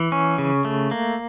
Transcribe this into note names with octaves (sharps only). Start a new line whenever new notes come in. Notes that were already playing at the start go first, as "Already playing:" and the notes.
Already playing: E3
C#4
C#3
A3
A#3